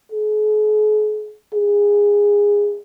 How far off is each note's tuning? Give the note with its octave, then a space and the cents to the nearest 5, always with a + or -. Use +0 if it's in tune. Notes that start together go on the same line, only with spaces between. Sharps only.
G#4 +45
G#4 -20